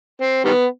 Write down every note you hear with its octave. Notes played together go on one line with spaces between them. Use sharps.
C4
D#3 G3 B3